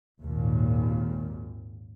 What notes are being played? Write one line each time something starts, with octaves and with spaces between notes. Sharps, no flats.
G#1 D#2 A#2